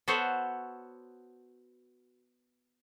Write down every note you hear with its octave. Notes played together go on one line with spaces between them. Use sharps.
B3 F#4 A4 C5 C#5